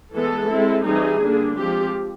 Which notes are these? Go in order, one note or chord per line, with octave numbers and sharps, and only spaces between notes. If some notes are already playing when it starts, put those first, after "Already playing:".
E3 G#3 B3 A4
G#3 C4 E4
E3 G3 C4 D#4 G#4
D3 G3 A#3 D4
F3 G#3 C4 G4